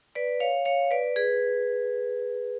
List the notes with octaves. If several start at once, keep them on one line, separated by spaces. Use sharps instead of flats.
B4 D5
C#5 F5
C#5 F5
B4 D5
G#4 B4